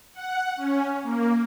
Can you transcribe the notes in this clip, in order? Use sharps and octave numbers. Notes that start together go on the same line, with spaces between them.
F#5
C#4
A#3